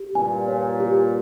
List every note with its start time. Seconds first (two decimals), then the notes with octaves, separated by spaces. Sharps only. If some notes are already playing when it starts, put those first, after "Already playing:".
Already playing: G4
0.14 G2 A#2 G#5
0.48 C#5
0.80 G4